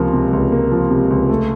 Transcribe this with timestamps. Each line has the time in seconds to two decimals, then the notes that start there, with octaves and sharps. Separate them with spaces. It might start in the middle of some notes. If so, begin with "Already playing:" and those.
Already playing: C#2 C3 F3 A#3
0.13 C3
0.33 C#2
0.52 A#3
0.72 F3
0.91 C3
1.10 C#2
1.29 A3